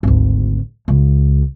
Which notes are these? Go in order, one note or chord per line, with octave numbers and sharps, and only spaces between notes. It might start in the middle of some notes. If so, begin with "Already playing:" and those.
G#1 D2
C#2